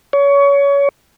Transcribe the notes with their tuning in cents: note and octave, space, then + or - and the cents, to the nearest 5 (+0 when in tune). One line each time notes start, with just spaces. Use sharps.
C#5 +25